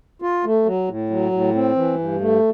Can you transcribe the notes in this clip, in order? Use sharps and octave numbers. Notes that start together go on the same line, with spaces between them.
F4
A3
F#3
A2
F#3
A2
C4
E3
G2
A3